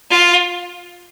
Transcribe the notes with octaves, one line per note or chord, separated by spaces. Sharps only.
F4